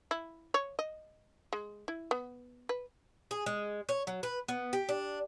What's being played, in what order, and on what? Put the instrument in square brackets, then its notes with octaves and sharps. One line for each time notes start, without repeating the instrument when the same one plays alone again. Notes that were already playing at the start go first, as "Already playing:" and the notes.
[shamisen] E4
C#5
D#5
G#3
E4
B3
B4
[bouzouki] G#4
G#3
C#5
F#3
B4
B3
G4
D4